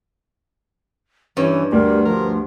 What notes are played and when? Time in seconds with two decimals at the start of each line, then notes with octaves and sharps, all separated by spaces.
1.37 G2 E3 C#4
1.72 D2 G3 A#4
2.05 F3 A#4